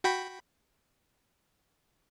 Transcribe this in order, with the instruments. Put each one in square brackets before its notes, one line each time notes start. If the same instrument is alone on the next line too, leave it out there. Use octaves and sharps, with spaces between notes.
[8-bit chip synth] F#4 G5 B5